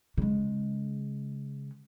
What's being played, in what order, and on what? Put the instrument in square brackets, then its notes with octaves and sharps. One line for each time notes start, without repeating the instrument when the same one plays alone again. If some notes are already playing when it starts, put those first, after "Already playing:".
[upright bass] C#3 G#3